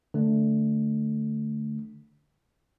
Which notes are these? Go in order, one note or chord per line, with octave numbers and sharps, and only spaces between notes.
D3 A3